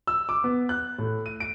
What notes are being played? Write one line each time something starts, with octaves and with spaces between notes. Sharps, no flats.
E6
D6
B3
F#6
A2
D#7
D7